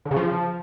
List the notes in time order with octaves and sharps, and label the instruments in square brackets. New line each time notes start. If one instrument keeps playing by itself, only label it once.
[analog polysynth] D3
C#3
F3